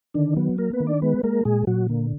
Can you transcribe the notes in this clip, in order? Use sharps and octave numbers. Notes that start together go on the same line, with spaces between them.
D3 D#3 D4
F#3 B3
A#3 A#4
B3 B4
D#3
D4 D5
G#3 B3 B4
G#3 A#3 A#4
A#2 G#3 G#4
A#2 F#3 F#4
D3 A#3